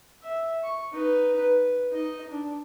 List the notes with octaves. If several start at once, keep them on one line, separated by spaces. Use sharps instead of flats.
E5
C#6
D#4 B4
B4
D#4 D#5
D4